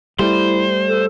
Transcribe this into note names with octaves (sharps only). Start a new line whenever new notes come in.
G3 A3 E4 C5
A4